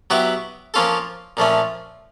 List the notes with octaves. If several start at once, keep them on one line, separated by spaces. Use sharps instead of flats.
F#3 B3 E4 G4 B4
F3 A#3 C#4 F4 A4
A#2 F3 A3 C#4